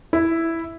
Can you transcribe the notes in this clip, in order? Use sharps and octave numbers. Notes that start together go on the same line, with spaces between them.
E4